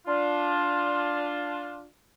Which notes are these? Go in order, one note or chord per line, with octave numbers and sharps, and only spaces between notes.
D4 F4